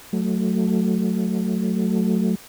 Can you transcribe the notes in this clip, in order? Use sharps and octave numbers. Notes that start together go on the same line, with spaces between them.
F#3 A3